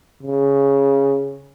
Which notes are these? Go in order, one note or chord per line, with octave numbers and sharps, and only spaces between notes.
C#3